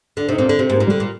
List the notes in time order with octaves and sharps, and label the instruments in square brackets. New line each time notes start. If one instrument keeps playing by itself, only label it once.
[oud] D3 [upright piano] D4
[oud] C3 [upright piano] D#4
[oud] A#2 [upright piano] C4
[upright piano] D4
[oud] D3
[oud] C3 [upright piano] C4
[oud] G#2 [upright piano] A#3
[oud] A#2
[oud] D3 [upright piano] G3
[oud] A#2